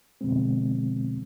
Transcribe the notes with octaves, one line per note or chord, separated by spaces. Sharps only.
F2 B2 D3 F3 G#3 C4